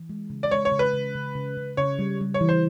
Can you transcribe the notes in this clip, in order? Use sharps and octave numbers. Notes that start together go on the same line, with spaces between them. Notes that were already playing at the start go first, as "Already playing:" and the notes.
Already playing: E3
G#3
C#3
D5
G#3 C#5
C#5
C#3
B4
C#3
C#3
C#3
C#3
C#3 C#5
G3
G3
C#5
E3
C5